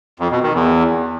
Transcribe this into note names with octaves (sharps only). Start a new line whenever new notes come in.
F2
B2
D#3
E2